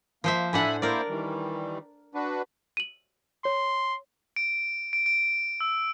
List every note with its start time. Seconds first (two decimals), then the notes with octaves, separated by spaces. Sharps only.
0.24 F3 A#3 C5 E5
0.53 A2 D4 E5 F#5 G#5 B5
0.82 A#3 E4 A#4 C5 D5
1.09 D#3 E3 G3
2.14 D4 F#4 B4
2.77 D#7 F#7
3.45 C#5 C6
4.36 D7
4.93 D7
5.06 D7
5.61 E6